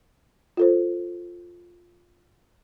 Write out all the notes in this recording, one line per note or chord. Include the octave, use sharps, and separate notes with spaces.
F4 A4 C5